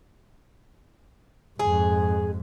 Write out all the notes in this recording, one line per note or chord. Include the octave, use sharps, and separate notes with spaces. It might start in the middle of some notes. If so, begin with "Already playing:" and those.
F2 G#2 G#4